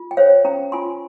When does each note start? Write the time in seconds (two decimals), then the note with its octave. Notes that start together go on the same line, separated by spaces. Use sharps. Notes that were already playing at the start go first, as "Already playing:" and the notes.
Already playing: F4
0.11 G5
0.17 C5 C#5 F5
0.45 C#4 G5 A#5
0.72 F4 G#5 C6